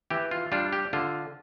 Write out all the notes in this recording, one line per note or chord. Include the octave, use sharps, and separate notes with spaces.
E3 G4
F4
G3 D4 F4
G4
D3 F4